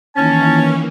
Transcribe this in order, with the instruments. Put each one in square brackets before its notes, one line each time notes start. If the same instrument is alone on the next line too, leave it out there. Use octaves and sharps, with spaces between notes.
[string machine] D#3 E3 A#3 [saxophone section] C#4 [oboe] A5